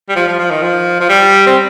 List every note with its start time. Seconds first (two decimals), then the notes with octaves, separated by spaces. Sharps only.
0.09 G3
0.16 F3
0.28 F3
0.39 F3
0.51 D#3
0.63 F3
1.00 F3
1.09 G3
1.47 C4